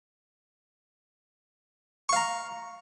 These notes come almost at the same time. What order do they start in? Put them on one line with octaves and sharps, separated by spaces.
C#6 F5 A#5